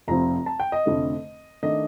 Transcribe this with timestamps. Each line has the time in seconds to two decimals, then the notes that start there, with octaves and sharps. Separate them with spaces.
0.08 F1 F2 C3 F3 C4 A#5
0.46 A5
0.60 G5
0.72 D#5
0.86 F1 F2 D3 A3
1.63 D#3 A3 D4 D#5